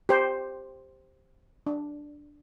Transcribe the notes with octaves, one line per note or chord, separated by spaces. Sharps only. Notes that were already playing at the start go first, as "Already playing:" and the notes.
G4 C5
D4